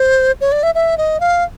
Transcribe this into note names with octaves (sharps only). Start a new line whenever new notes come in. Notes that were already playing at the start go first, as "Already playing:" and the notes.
Already playing: C5
C#5
D5
E5
E5
D#5
F5